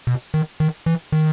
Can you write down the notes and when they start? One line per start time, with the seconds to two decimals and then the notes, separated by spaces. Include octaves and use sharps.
0.07 B2
0.34 D#3
0.60 D#3
0.86 E3
1.12 D#3